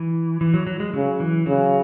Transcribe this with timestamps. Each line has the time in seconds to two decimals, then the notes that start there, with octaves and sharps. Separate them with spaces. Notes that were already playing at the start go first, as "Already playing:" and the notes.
Already playing: E3
0.41 E3
0.54 F#3
0.67 F#3
0.80 G#3
0.94 C#3 F#3
1.20 E3
1.46 C#3 F#3